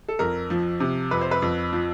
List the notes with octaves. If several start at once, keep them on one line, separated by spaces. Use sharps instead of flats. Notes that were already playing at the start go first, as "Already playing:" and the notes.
A4
F2 A#4
F3
C3
F2 B4
C5
B4
F2
F3